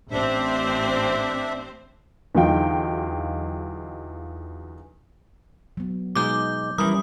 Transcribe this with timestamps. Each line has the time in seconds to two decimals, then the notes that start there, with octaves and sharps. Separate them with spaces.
0.11 A1 C4 D4 C5 E5
2.35 E2 D3 F#3 D#4 F4 G5
5.77 F#3 B3
6.16 B2 G#3 D#4 D6 G6
6.78 E3 G3 C#4 E4 A#4 D#6